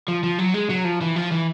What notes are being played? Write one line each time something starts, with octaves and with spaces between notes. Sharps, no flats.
F3
F3
F#3
G#3
F#3
F3
E3
F3
E3